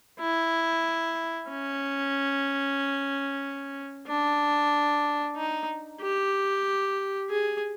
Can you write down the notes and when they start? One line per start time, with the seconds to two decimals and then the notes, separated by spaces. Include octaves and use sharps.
0.20 E4
1.49 C#4
4.07 D4
5.36 D#4
6.01 G4
7.30 G#4